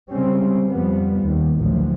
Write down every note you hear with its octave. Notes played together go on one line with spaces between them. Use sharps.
C#3 G3 G#3 C4 C#4
F2 F3 G3 B3
D#2
A1 D2 A2 F3 F#3